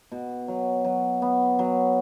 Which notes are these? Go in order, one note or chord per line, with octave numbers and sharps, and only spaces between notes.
B2
F#3
F#3
B3
F#3